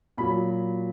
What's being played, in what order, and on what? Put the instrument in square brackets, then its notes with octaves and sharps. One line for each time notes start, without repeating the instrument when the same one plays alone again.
[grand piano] A#2 F#3 B5